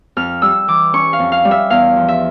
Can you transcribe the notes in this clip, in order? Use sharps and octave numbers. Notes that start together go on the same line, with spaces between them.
F2 F6
G3 E6
E3 D6
C#4 C#6
F5
F2
F5
G3
E5
E2 F5
F3
E5